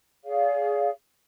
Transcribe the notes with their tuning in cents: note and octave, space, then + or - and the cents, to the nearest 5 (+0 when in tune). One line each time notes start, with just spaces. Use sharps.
G#4 +5 D5 -40 F5 +0